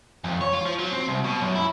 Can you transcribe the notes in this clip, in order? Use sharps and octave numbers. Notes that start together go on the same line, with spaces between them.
F2
C#5
F4
F3
F#3
C4
C2
B2
F#2
E4